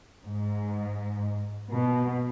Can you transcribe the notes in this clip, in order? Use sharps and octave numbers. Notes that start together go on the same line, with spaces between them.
G#2
B2